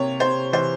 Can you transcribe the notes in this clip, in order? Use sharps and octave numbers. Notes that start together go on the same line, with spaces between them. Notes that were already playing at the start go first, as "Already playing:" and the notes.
Already playing: C3 A#3 C#5
C3 C5
E3 C5